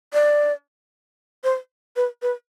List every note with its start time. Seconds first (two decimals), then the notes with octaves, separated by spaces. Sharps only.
0.13 D5
1.44 C5
1.96 B4
2.22 B4